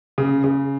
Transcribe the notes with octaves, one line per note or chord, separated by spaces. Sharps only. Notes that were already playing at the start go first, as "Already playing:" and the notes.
C#3
C#3